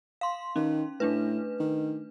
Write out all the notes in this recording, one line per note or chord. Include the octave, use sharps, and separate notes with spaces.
F5 C6
D#3 C#4 D#4
A2 A3 D4 B4
D#3